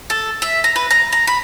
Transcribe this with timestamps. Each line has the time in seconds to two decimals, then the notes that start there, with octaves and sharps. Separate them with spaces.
0.10 A4
0.42 E5
0.64 A#5
0.76 B4
0.91 A#5
1.12 A#5
1.27 B5